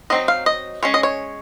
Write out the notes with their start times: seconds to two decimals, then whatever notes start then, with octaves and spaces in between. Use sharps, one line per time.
0.10 F#3 C4 D#4 D#5
0.28 F5
0.46 D#5
0.83 G#3 C#4 C#5
0.94 D#5
1.03 C#5